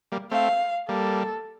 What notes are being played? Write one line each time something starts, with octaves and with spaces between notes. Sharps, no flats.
G3 A#3
A3 C4 F5
G3 A#3 A4